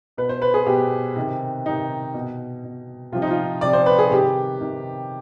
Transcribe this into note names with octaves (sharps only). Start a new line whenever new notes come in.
B2 B4
C5
B4
G#4
B2 G4
C3 D#3
C3 D#3 D#4
B2
B2
C3 F3 F4
D#4
F4
C3 F3 D5
C5
B4
G#4
C3 D#3 G4
C3 D#3